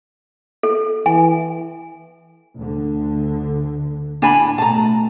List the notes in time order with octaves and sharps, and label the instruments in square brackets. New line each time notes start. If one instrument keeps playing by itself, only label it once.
[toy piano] A4
[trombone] E3 [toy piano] G#5
[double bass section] D2 D3
[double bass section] A2 [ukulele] D4 G#5 B5
[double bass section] B2 A3 [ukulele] A5 A#5